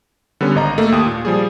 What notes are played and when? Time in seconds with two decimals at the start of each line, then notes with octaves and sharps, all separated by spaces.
0.41 D3 G3 B3 C#4
0.55 G#1 D#5 A#5
0.78 A3 A#3
0.92 D#2 G4 D#6
1.07 A#2
1.25 F3 G3 G#4